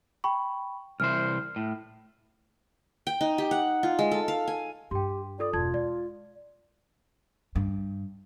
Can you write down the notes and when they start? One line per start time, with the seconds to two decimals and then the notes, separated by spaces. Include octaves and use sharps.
0.24 G5 B5 C#6
1.00 C2 E3 C5 F6
1.56 A2
3.07 G5
3.21 D#4
3.38 G4
3.51 F#5
3.83 F4
3.99 G#3
4.11 A4
4.28 F5
4.48 G#5
4.91 G2 G4 G5 C6
5.39 F4 A4 D5 D#6
5.53 E1 F4 A5 G#6
5.74 G#3 D5
7.56 G2